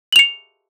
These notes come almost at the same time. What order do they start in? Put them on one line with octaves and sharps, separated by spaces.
F#7 F7 C#7